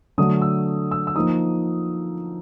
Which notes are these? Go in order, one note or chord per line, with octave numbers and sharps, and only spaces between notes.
D3 F#3 A3 D4 D#6
E6
E6
E6
F3 A#3 D#4 D#6